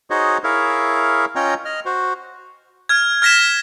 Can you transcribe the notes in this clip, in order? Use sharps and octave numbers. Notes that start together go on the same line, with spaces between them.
D#4 F#4 G#4 C5 C#5 D#5
E4 G#4 A#4 C#5 E5 F5
C#4 F4 C#5 D#5 G5 A#5
D#5 F6
F#4 C5
F6 G#6
F6 G#6 A#6 B6 E7